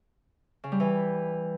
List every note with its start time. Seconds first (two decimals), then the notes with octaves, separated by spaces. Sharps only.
0.64 C#3
0.72 G3
0.80 E3